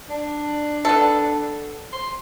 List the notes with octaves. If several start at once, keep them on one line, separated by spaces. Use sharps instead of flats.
D4
B3 A4
C6